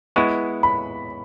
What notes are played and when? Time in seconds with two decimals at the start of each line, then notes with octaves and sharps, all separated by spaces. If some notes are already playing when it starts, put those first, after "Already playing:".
0.16 G#3 B3 E4 C#6
0.63 B5